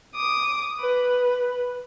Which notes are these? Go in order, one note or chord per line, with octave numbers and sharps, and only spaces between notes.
D6 D#6
B4